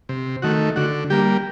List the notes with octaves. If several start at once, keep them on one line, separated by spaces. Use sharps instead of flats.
C3
D#3 A3 F#4
D3 F#4
G3 A#3 G4